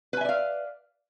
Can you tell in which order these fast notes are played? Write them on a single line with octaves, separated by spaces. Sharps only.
B4 G#5 E5 D5 F5